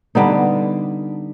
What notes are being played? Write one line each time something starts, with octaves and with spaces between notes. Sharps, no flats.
D3 G3 B3 D#4